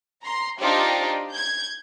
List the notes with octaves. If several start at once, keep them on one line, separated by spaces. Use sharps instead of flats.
A#5 C6
D4 D#4 F4 G4 C5 D5
G6 G#6